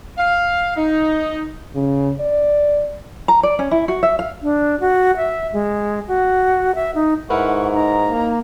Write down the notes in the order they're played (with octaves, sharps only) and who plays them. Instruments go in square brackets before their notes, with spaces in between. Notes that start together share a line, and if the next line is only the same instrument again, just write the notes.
[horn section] F5
D#4
[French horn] C#3
D5
[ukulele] A#5
D5
C#4
E4
F#4
E5
F5
[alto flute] D4
F#4
E5
G#3
F#4
E5
D#4
[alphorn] G#2 [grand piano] E4 A#4 B4 [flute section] F#5 C#6
[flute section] D#4 A#5
[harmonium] A#3